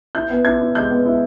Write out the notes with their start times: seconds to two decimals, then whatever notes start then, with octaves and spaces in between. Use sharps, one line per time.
0.15 E4 G6
0.30 B3
0.45 E4 G#6
0.60 E4
0.75 G#3 G6
0.90 B3
1.06 E4